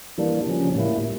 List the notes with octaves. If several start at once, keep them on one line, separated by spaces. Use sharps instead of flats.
E3 G3 A#3 D4
C#3 F3 C#4
A2 G3 A#3 E4